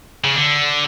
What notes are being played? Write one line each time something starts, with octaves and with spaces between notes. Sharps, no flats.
C#3
D3